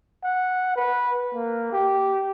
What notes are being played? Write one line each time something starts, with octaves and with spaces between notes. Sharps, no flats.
F#5
B4
A#3
G4